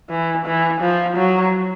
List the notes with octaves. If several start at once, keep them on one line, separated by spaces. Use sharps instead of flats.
E3
E3
F3
F#3